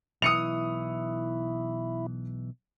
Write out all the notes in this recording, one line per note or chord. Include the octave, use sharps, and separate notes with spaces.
B1 E3 E4 D#6 C#7 F7